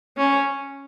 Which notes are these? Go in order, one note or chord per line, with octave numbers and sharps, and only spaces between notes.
C#4